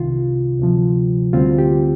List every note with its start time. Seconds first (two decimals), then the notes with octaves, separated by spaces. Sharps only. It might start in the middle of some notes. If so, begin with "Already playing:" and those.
Already playing: C2 C3 D#3 F4
0.59 D2 C3 F3
1.33 D2 D3 G3 C4 F4
1.58 G4